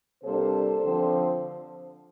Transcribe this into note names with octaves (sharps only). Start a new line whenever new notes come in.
C3 G3 A#3 D4 A4 C5
D3 F3 C4